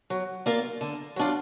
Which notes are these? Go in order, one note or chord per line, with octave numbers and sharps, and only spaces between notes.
F#3
A#3 F4 A#4 D5
D3
F#3 D4 F4